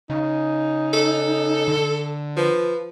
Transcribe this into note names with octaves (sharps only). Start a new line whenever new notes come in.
C#3 D#4
A4
D3
F3 B4